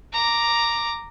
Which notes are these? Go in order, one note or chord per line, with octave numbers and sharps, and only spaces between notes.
A#5 D6